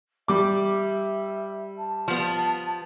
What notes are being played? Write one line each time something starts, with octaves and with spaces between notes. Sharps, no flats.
G3 E5 D6
A5
F3 B3